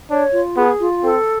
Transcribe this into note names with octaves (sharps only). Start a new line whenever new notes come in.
D4 C#5
F4
B3 G#4
F4
C4 A4